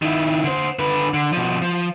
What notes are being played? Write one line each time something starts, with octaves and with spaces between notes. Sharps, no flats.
D#3 E4
D3 C5
D3 B4
D3
B2 F3
F3